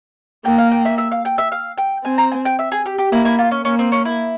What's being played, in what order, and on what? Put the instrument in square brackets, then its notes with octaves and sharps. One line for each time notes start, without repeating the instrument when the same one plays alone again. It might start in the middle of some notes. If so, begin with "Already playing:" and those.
[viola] A#3 [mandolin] G5
[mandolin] F5
G5
E5
E5
F5
G5
E5
F5
G5
[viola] C4 [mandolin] G#5
[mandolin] A#5
G#5
G5
E5
G#4
G4
G4
[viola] A#3 [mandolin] E4
[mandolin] E4
F4
C#4
[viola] A#3 [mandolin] C#4
[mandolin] C4
C#4
E4